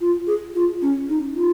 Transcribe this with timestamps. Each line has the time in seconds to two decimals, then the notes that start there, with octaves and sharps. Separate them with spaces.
0.01 F4
0.27 G#4
0.55 F4
0.82 C#4
1.09 D#4
1.35 F4